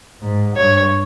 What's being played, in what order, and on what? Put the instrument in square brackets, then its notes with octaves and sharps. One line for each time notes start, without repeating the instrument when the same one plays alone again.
[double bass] G#2
[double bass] G2 [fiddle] C#5